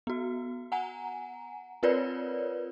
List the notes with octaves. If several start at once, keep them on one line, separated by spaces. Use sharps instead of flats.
B3 F#4
F#5 G#5 A#5
C4 F4 A#4 B4 C#5 D5